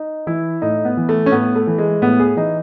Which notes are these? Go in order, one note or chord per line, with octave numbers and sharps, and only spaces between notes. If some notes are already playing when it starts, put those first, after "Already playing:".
Already playing: D#4
E3 E4
A2 D#4
B3
E3
A3
C#4
A2 B3
A3
E3
G#3
A2 B3
G#4
E3 D#4